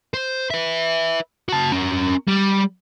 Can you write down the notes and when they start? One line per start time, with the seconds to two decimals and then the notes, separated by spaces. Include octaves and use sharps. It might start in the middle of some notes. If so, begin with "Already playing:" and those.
0.14 C5
0.50 B4 E5
1.49 F#4 A5
1.72 C#4 A#4
2.28 G3